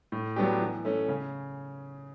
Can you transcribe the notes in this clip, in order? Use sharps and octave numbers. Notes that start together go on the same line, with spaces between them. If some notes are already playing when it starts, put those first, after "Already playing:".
A2
F#3 B3 D4 G4
E3
A3 C#4
C#3